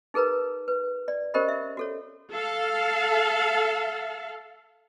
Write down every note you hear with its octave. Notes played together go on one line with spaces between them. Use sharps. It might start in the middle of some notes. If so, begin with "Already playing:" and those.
D#4 G#4 A#4 B4 A#5
B4
D5
C#4 G4 A#4 C5 D#5 B5
E5
F#4 A4 C#5
A4 F5